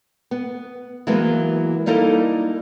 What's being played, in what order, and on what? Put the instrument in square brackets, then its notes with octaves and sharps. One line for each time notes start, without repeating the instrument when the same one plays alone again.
[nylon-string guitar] B3
E3 F#3 G#3 A#3 B3
G3 A#3 D#4 E4 A4 A#4